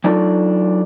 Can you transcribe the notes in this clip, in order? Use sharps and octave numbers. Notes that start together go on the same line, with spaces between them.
F#3 D4 D#4 F4 A4